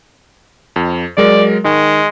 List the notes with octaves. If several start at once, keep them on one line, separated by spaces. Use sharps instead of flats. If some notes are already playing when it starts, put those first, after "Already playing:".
F2
F#3 G#3 A#4 D5
D#3 G#3